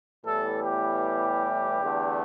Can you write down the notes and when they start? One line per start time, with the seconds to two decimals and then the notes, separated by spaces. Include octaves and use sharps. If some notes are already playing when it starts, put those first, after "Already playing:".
0.24 A2 E3 G3 B3 A4
0.63 G4
1.81 E2 D3 A3